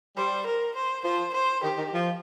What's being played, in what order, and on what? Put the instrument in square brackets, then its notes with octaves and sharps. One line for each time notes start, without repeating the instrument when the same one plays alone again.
[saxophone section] G3 [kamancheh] C5
[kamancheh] A#4
C5
[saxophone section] F3 [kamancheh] C5
[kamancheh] C5
[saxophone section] D#3 [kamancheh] G4
[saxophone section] D#3
F3